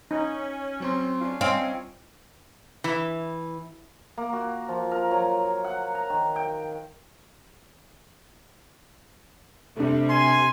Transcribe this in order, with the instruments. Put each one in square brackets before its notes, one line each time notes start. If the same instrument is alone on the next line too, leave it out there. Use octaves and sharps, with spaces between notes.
[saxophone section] C#4 [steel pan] D#4
[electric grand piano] F#3 C4 C6
[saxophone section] C#4 D4 F4
[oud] C4 [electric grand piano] C#5 D#5 G#5 [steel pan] F5
[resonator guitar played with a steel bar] E3
[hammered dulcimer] A#3
F#4
F3
A#4
F#3
F#5
A#5
D#3
G5
[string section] C3 G3 [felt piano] A3 D4
[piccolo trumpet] G#5 [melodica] C6